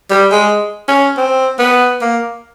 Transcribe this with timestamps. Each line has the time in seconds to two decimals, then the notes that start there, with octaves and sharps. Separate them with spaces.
0.10 G3
0.32 G#3
0.88 C#4
1.17 C4
1.59 B3
2.01 A#3